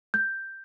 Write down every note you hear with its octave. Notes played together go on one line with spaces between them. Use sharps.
G6